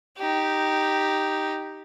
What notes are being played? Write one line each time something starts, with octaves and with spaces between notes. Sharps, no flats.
D#4 G4